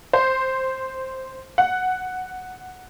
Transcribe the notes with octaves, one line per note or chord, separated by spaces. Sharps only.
C5
F#5